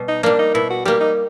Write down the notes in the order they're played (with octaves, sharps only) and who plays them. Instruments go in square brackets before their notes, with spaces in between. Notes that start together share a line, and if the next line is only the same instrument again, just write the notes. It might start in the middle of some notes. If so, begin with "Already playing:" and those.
Already playing: [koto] B2 G3
[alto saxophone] D#4
[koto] G3 A#3 [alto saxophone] D4
[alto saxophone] D#4
[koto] B2 [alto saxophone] E4
[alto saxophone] F#4
[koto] G3 A#3 [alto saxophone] G4
[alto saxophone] D#4